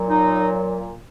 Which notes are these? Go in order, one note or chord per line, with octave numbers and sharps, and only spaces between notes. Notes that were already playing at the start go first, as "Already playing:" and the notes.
Already playing: A#2 F#3
D#4